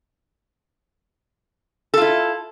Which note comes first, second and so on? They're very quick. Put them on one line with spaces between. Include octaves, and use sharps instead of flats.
A4 F4 E4